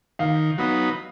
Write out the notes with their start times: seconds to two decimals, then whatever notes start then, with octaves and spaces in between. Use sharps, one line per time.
0.19 D#3 F5
0.58 F#3 B3 D#4